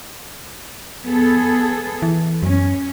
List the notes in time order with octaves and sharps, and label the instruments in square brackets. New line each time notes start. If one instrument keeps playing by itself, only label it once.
[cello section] B3 G#4 A4
[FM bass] E3
[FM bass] F#2 [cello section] C#4